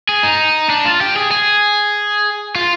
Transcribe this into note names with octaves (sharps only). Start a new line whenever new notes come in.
G#4
D#4
D4
F4
G4
G#4
G#4
F4